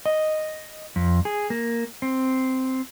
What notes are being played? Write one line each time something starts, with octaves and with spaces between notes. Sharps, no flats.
D#5
F2
G#4
A#3
C4